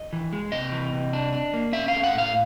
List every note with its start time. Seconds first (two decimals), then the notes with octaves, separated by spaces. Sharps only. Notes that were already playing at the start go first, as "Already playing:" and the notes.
Already playing: D#5
0.13 E3
0.33 G#3
0.52 C3 D#5
0.72 E3
0.93 C3
1.13 D4
1.33 D4
1.54 A#3
1.73 C#4 E5
1.88 F5
1.93 A3
2.04 F#5
2.14 A2 F5